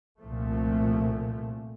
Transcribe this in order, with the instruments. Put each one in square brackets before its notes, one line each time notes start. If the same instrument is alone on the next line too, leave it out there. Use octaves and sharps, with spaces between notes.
[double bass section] C2 A#2 F3 A3